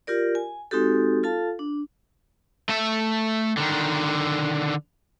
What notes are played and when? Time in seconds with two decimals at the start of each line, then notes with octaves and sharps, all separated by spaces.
0.07 F4 G4 A#4 D5
0.35 G#5
0.71 G#3 C4 D#4 F#4 G4 A4
1.23 F4 A4 F5 A5
1.59 D4
2.69 A3 E5
3.57 D3 D#3